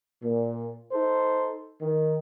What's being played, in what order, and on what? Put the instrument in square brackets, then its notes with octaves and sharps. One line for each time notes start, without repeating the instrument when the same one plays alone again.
[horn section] A#2
D#4 A4 C5
D#3